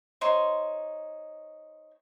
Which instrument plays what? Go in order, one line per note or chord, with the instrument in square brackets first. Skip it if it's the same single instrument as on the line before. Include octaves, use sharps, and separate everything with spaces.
[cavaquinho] D#4 C5 C#5 C6